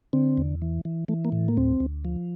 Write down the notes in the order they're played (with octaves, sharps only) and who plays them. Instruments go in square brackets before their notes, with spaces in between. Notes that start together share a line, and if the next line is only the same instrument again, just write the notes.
[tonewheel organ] D3 C4
E2
E3
E3
E3 A3
A#3
A2
A#3
D2 C4
D2
F3